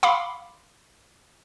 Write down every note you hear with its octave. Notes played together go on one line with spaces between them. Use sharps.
F5 B5 C6 D6